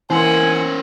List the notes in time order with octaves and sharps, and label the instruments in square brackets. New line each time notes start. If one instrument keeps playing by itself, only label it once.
[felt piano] E3 C6 [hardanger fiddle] A#3 F#5 [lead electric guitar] C#4 C5 [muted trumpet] G#5